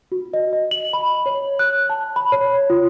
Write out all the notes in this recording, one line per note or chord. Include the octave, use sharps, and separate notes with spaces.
F#4
D#5
D#5
F#7
B5
C#5
F#6
A5
B5
C#5
F4